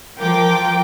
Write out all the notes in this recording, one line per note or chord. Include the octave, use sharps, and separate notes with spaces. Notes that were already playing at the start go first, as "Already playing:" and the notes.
F3 A#4 G5 D6